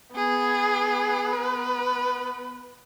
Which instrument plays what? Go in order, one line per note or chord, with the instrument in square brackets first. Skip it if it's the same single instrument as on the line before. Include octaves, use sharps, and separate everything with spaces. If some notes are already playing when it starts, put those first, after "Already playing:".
[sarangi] B3 [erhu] G#4
[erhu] B4